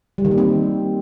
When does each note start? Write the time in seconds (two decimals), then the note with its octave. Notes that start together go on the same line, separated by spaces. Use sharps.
0.18 G3
0.25 D#3
0.31 A#3
0.38 C4